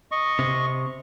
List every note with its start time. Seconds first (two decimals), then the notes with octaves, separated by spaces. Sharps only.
0.12 D#5 C#6
0.39 C3